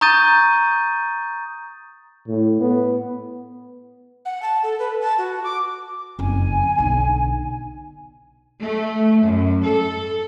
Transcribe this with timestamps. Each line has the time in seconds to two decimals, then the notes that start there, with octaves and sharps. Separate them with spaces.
0.01 A#5 C#6 D#6 G6 A6 D#7
2.28 A2
2.61 B3
4.25 F#5
4.42 A5
4.63 A4
4.79 B4
5.01 A5
5.18 F#4
5.44 D6
6.19 F#1 F2 G#5
6.78 B1 D3
8.62 A3
9.25 F#2
9.66 A4